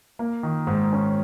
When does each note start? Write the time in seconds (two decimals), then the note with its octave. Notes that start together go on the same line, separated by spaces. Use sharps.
0.19 A#3
0.43 D#3
0.67 G#2
0.92 C#4